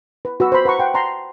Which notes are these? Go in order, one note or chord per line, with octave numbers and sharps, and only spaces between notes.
B4
F#4 B4 E6
C5 B5
B4 F#5 A#5 C#6
F#5 G5 C6
A5 A#5 C6